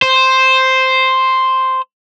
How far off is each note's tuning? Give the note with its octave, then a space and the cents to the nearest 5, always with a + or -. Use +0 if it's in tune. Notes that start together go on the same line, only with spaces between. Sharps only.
C5 +0